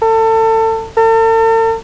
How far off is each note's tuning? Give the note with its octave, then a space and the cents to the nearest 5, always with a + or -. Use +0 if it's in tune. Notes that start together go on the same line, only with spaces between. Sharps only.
A4 +30
A4 +45